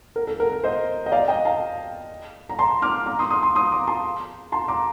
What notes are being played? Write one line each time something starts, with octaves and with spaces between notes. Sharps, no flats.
A#4
A4
A#4
A4
C5 D#5
D#5
D5 F5
D#5 G5
F5 A5
A#5
A5 C6
D6 F6
A#5 D6
C6 D#6
C6 D#6
C6 D#6
C6 D#6
A#5 D6
A5 C6
A5 C6
A#5 D6